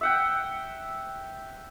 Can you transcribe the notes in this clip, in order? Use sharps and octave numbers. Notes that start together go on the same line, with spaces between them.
E5 F#5 G5